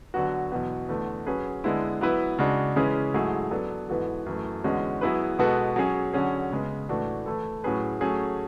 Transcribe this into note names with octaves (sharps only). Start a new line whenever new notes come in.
D3 F#3 B3 F#4
E2 B2 F#3 B3
E2 D3 A3
F#3 C#4 G#4 B4
D3 G#3 B3 E4
F#3 B3 E4 B4
C#3 G#3 D4 F#4
C#3 E3 G#3 C#4 G#4
G#2 F#3 A3 E4 G#4
F#3 B3 D4 A4
G#2 E3 B3 F#4 A4
F#2 E3 A3
E2 D3 G#3 C#4 F#4
F#3 B3 E4 G#4 B4
B2 G#3 B3 F#4 A4
F#3 C#4 G#4
D3 F#3 C#4 G#4
C#3 G#3 B3
A2 E3 A3 D4 F#4
E3 A3 E4 A4
A2 F#3 C#4 G#4 B4
F#3 A3 C#4 G#4